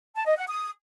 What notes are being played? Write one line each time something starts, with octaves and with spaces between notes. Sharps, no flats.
A5
D#5
F#5
D#6